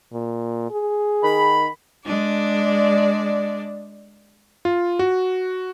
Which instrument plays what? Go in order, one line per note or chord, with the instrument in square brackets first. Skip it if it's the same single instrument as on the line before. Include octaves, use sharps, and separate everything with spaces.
[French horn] A#2
G#4
[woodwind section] D#3 B5
[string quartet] G#3 D4 D5
[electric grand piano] F4
F#4